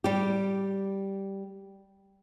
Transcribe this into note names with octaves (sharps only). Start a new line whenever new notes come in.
G3 G4